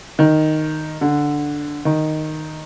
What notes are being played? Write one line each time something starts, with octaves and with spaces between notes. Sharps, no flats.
D#3
D3
D#3